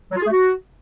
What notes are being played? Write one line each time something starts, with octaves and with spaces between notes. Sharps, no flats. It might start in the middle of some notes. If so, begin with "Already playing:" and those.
F#3
F4
G#4
A3
F#4